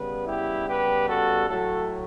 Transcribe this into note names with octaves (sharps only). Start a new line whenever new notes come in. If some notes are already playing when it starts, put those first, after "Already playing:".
Already playing: C#3 G3 B3 B4
E4 G4
G4 B4
F#4 A4
A2 F#3 A3 F#4 A4